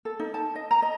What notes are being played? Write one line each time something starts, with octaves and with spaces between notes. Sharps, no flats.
A4
D#4
A5
D#5
A#5
D#5